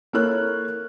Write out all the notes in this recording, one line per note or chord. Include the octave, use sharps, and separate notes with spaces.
A#3 E4 A4 C#5 F6 F#6